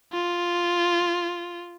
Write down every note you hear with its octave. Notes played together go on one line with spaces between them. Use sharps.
F4